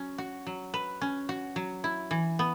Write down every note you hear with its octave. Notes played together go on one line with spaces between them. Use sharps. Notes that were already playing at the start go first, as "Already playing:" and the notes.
Already playing: F#3 C#4
F#4
F#3
B4
C#4
F#4
F#3
E4
E3
B3